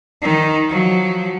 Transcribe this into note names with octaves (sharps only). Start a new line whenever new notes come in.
D#3 D#4
F3 F#3